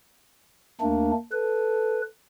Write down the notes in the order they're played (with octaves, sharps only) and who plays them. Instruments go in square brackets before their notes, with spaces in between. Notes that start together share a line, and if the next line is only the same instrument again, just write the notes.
[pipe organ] D#2 A3 D4 [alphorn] A#3
[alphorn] A4 [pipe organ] B4